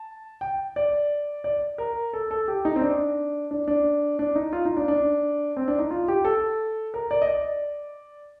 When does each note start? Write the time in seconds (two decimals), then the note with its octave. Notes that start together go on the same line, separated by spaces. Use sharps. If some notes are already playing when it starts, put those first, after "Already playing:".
Already playing: A5
0.41 G5
0.76 D5
1.44 D5
1.78 A#4
2.13 A4
2.31 A4
2.48 G4
2.65 D#4
2.76 C4
2.82 D4
3.51 D4
3.68 D4
4.19 D4
4.35 D#4
4.53 F4
4.65 D#4
4.77 D4
4.88 D4
5.57 C4
5.68 D4
5.79 D#4
5.91 F4
6.08 G4
6.25 A4
6.94 A#4
7.11 D5
7.22 D#5
7.27 D5